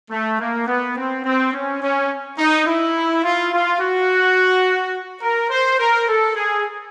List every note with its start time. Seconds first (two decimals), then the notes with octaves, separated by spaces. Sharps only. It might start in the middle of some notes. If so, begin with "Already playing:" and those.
0.10 A3
0.39 A#3
0.66 B3
0.96 C4
1.23 C4
1.52 C#4
1.81 C#4
2.38 D#4
2.66 E4
3.23 F4
3.51 F4
3.79 F#4
5.21 A#4
5.50 C5
5.79 A#4
6.07 A4
6.34 G#4